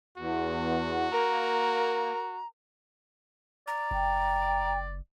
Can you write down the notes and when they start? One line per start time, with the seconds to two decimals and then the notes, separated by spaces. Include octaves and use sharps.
0.18 E2 F#4
1.12 A#3 A#4 A#5
3.67 D5 A#5
3.91 F#1 G5